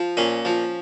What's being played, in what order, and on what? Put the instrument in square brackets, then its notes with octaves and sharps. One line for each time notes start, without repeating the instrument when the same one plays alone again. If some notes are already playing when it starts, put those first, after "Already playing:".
Already playing: [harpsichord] F3
A#2 C#4
F3